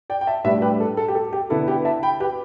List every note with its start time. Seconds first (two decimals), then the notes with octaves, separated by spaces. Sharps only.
0.10 D5 G5
0.21 G5
0.27 E5 A5
0.44 A2 G3 D4 B4 E5
0.62 G4 B4
0.80 A4
0.97 A4
1.08 G4
1.15 A4
1.33 G4
1.50 D3 B3 E4 A4
1.68 G4 B4
1.85 E5 A5
2.03 G5 B5
2.20 G4 B4